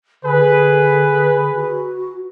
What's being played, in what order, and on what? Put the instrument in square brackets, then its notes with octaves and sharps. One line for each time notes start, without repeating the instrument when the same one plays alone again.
[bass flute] D3 [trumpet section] G#4 B4
[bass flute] F#4